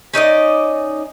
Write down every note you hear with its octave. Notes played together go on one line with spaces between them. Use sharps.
C#4 D#4 D5 D#5